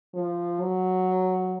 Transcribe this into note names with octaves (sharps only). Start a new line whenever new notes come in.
F3
F#3